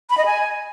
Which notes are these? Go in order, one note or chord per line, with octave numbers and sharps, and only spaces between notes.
B5
D#5
G#5